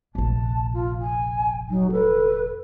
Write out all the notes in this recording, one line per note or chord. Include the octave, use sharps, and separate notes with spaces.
F1 A#1 A5
F4
G#5
F#3 D#4
A4 B4